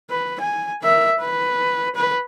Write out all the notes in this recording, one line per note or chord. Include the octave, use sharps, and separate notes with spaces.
B4
G#5
A#4 E5
B4
B4